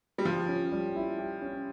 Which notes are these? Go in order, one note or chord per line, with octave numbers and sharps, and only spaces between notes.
G3
F3 G4
C#4
G3
E4
G4
C#4